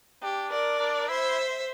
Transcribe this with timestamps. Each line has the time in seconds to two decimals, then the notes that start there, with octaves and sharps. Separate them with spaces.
0.23 D4 G4
0.51 A#4 D5
0.80 D4
1.09 E4 C5 E5